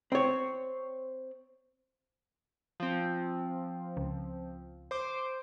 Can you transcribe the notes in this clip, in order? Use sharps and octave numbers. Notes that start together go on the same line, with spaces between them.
C4 C#5
F3 C4
C#2
C5 D6